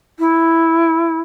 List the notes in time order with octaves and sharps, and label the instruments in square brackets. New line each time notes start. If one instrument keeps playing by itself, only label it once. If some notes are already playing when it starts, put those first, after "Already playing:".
[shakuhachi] E4